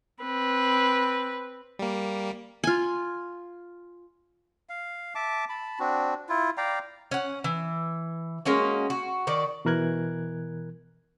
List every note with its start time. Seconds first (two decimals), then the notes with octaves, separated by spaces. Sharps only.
0.23 C4 B4
1.79 G3 A#3
2.64 F4 G#5
4.69 F5
5.15 E5 A5 D6
5.49 A5 B5
5.79 C4 D4 F#4
6.29 E4 F4
6.57 D5 F5 G5 A#5
7.11 C#4 F#5
7.44 E3
8.45 G#3 A#3 C#4 F#4
8.90 F#4
9.27 D#3 F#4 D5
9.65 B2 E3 A#4 F#6 G#6